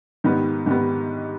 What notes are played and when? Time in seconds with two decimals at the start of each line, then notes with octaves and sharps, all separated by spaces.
0.24 G#2 D#3 G3 B3
0.66 G#2 D#3 G3 B3